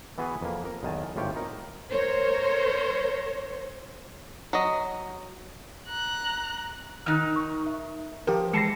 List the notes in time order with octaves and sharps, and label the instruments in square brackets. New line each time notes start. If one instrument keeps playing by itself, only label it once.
[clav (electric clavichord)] E3 B3 F#4 G#4 B4
F2 A#3
A#4
B1 E2 D#3 G#5 A5
G#1 A2 F4 G4 C#5 G5
D#4 A#4
[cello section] A#4 C5 C#5
[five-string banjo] F#3 D#5
[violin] A#5 F#6
[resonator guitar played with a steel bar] D#3 D#4 [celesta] F6 F#6
[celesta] C#6
E5
[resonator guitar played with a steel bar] F3 [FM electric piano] G4 A#4
[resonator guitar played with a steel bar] E3 A5 [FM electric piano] G#3 A#6 [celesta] C7 C#7